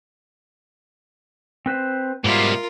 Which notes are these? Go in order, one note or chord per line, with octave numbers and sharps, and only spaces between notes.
C4 B4 C5
G#2 B2 G3 A#3 F4 A#4 E5